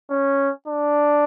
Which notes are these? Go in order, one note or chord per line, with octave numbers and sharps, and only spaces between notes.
C#4
D4